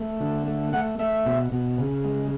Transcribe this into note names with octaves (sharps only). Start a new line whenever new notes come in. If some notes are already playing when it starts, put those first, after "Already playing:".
Already playing: A3
D3
A3
A3 F#5
A3 E5
B2
B2
C#3
G#3